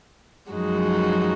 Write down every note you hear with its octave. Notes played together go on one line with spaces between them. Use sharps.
F#2 F3 G#3 D#4 F#4